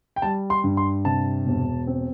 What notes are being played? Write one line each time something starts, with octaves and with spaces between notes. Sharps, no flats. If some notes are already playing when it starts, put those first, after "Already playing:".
G5
G3 A5
C6
G2
C6
C3 A5
E1
C4